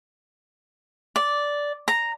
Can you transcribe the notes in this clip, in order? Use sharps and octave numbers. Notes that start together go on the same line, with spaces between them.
D5
A#5